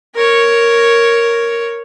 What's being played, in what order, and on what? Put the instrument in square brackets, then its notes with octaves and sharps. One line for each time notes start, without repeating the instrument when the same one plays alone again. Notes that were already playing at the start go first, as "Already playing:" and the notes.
[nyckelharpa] A#4 C#5